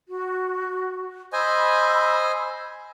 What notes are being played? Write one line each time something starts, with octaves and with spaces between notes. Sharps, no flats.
F#4
C5 D#5 G#5 B5 E6